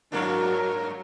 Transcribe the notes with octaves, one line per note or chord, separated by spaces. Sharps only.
G2 F#3 A#3 D4 A#4